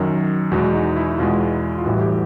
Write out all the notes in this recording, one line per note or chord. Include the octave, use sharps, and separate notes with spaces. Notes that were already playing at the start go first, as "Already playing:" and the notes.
Already playing: F#2 D#3 F#3
E2 B2 G#3 F#4
D#4
E4
E2 B2 G#3 F4
F4
A1 A2 E3 G3 F#4
G4